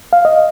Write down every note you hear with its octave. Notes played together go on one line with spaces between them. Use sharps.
F5
D#5